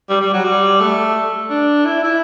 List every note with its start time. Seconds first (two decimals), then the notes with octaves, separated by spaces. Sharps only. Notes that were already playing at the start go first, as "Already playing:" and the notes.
0.10 G3
0.21 G3
0.33 F#3
0.44 G3
0.80 A3
1.50 D4
1.85 E4
2.03 E4